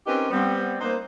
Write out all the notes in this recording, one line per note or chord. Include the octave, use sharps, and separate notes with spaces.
C4 C#4 D#4 G4 A#4 B4
G3 B3 C4
A#3 D#4 B4 C5